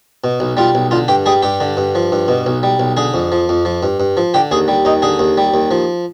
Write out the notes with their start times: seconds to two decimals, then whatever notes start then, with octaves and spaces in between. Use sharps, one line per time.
0.24 B2
0.40 B1
0.57 G3 F4
0.75 B1
0.91 D3 F4
1.08 G2 G4
1.26 G3 G#4
1.42 G2 G4
1.61 D3
1.77 G2
1.95 F3
2.12 G2
2.28 B2
2.46 B1
2.63 G3
2.80 B1
2.97 D3 G#4
3.14 F2
3.32 F3
3.49 F2
3.65 F3
3.83 G2
4.00 G2
4.17 F3
4.34 D3 G4
4.51 D#2 G#4
4.68 G3
4.85 D#2 D#4
5.02 D3 G#4
5.19 D#2
5.38 G3
5.54 D#2
5.71 F3